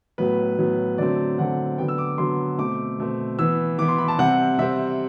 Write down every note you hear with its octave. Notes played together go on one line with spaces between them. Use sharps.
A2 F#3 B3 B4
A2 F#3 B3
D3 F#3 A3 C4 D5
D3 F#3 A3 C4 F#5
D3 F#3 B3 G5
E6
D6
D3 F#3 B3 C6
B2 A3 C4 D6
B2 A3 C4
E3 B3 E6
E3 B3 D6
C6
B5
A5
C3 G3 C4 F#5
C3 G3 C4 E5